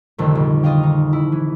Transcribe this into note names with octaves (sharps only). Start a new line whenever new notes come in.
C2 F2 D3 D#3 A3
A#1
F4 D#5 F5 G5
D#4
E4
E3